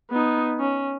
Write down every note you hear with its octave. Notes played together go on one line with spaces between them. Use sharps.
B3 D#4
C#4